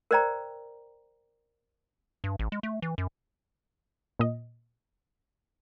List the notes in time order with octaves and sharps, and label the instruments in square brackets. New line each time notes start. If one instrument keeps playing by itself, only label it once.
[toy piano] A#4 C5 D5 G5 A#5
[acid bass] G2
A1
G#3
A3
E3
F#2
[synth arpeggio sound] A#2 D#5